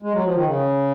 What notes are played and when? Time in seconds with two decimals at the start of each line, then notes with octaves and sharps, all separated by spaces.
0.02 G#3
0.14 F#3
0.24 F3
0.34 D#3
0.45 C#3